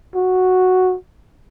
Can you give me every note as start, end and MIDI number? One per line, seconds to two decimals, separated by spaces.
0.15 0.96 66